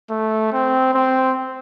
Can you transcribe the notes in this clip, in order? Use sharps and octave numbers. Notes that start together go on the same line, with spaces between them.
A3
C4
C4